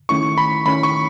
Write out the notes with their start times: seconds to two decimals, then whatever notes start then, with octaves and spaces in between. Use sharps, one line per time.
0.09 D#3 A3 C#4 E4 C#6
0.38 B5
0.66 D#3 A3 C#4 E4 B5
0.83 C#6